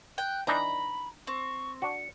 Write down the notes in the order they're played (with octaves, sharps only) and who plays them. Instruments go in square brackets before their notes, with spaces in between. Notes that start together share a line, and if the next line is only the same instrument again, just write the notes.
[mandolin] G5 [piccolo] F#6
[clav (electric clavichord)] E3 D4 D#4 [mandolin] A#5 [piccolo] B5
[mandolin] C4 [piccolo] C#6
[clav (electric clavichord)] D4 F#4 [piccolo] C#7